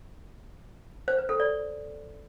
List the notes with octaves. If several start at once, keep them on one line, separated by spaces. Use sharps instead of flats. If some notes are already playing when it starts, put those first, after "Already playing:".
C5
B4
A4
D5